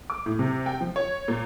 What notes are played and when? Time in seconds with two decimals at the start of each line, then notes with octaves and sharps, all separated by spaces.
0.10 D6
0.26 A2
0.39 C3
0.66 G5
0.81 F3
0.96 C#5
1.28 A#2